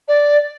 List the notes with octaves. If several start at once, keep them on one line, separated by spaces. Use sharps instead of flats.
D5